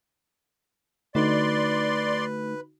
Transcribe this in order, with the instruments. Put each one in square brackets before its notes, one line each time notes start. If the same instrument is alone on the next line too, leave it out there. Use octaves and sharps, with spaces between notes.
[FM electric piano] D3 D#4 F#4 [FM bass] A3 [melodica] B4 [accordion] D5 C6